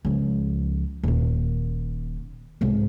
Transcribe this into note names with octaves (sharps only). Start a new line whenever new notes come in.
C#2 F3
D#1 A#2
C2 G#2